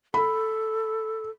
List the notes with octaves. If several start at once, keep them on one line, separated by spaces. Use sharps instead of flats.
A4 B5